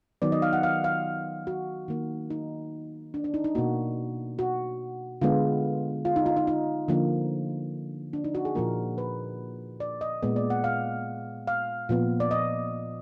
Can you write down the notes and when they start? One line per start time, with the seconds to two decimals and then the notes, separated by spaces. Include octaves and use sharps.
0.22 D#3 F#3 B3 D5
0.32 D#5
0.42 F5
0.53 F#5
0.63 F5
0.84 F5
1.47 F#4
1.88 D#3 A#3
2.30 D#4
3.14 D4
3.24 D4
3.34 D#4
3.44 D#4
3.55 B2 A#3 F#4
4.39 F#4
5.22 D3 G#3 B3 F4
6.05 F4
6.16 D#4
6.26 F4
6.37 D#4
6.47 D#4
6.88 D3 F3 A#3
8.13 D4
8.24 D#4
8.35 F#4
8.45 G#4
8.55 A#2 F3 A#3 A#4
8.98 B4
9.80 D5
10.01 D#5
10.23 A#2 G#3 B3
10.36 D5
10.50 F#5
10.64 F5
11.47 F5
11.89 A#2 F3 B3
12.20 D5
12.31 D#5